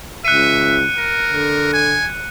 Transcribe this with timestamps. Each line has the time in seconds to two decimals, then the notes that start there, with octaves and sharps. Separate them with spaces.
0.25 C#2 E5 F#6 C#7 D#7
0.97 A#4
1.26 D3
1.73 G#5